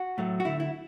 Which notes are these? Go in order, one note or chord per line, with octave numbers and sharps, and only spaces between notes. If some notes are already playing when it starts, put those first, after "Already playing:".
Already playing: F#4
A2 F#3 A3
F#4
D2 D3 A3 E4
E4